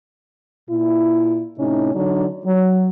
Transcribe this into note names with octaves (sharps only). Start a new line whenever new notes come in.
A#2 E4
A2 C3 C#4 D#4
D3 F#3 D4 D#4
F#3